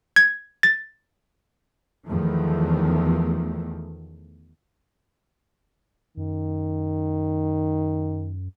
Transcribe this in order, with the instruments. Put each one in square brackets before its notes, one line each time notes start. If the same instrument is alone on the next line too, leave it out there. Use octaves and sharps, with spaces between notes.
[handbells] G#6
A6
[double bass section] E2 D#3 F3 A3
[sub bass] F#2 [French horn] D#3